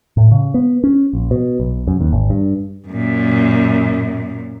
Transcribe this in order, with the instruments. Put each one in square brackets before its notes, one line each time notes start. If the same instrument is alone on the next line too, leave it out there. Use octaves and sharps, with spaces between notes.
[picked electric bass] A2
C#3
B3
C#4
A#1
B2
B1
F#2
D#2
G#1
G2
[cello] F#2 A#2